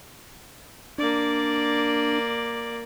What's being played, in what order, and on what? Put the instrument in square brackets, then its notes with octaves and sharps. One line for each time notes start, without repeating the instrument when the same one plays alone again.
[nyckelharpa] A#3 D5 [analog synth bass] D4